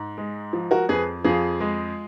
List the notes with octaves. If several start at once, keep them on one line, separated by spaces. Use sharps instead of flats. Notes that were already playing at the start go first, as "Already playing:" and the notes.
Already playing: G#2
G#3
F3
F#4 A#4
F2 G#4 B4
F2 F4 G#4
G#3